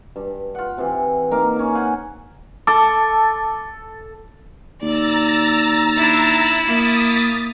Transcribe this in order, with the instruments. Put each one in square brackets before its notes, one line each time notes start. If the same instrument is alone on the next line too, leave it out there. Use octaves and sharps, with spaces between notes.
[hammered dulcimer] G2
F4 F#5
C3 E3
A#3 D#4 A#4 F5
C#3 C#4
C5 F5 F#5 G#5
[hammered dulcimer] A4 [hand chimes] A5 D6
[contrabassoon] D#2 [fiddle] D5 [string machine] A#5 E6 A6
[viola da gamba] D4 [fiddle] E4
[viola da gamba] A#3 [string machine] D#6 A6 B6